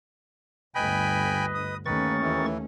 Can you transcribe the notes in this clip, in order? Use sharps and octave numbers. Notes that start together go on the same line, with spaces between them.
G1 D2 B4 D#5 G5 G#5 B5
D#6
D#2 D#3 A3 C#4 B4 C#6 A6
E3